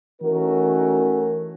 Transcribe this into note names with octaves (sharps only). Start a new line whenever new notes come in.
E3 A3 C#4 D#4 F#4 A#4